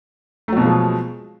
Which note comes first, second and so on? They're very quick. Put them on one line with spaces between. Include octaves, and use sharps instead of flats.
A3 F#3 B2 F3 G#3